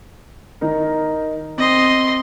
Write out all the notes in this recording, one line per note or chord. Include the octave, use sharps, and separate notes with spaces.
D#3 D#4 A#4
C4 D#5 C6